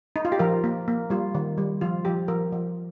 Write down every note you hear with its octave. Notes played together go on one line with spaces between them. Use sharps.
D#4
F4
G4
F3 A#4
A#3
A#3
G3 F4
D#3
G3
F3 F4
F3 G4
F3 A#4
F3